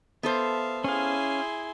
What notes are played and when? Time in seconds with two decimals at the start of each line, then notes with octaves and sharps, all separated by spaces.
0.23 B3 A4 C5 E5 F5
0.84 C#4 E4 G#4 F5 C6